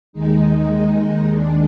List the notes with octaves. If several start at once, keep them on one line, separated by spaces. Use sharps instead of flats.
D#2 D#3 G#3 D#4
D#2 D#3 G#3 D4